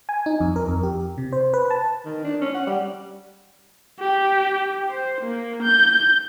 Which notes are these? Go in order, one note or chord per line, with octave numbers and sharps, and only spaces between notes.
G#5
D#4
F2
A#4
F2
G4
C3
C5
B4
A5
D#3
D4
C#4
F#5
G3
G4
C5
A#3
G6